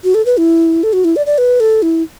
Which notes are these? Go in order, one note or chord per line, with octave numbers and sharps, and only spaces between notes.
F#4
A4
B4
E4
A4
F#4
E4
D5
D5
B4
A4
E4